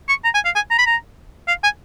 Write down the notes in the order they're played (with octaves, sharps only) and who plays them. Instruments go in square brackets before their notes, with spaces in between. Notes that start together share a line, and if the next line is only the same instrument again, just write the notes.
[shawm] C#6
A#5
G#5
F5
G#5
A#5
B5
A#5
F5
G#5